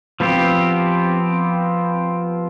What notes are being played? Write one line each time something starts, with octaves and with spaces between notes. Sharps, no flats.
F3 B3 C4 G4